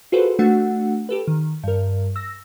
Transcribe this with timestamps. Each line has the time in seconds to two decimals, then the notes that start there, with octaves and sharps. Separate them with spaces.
0.12 F4 F#4 G#4 A4 B4 C5
0.39 A3 D4 F#4 F#5
1.09 G4 A4 B4
1.27 D#3
1.64 G2 A#4
2.16 E6 A#6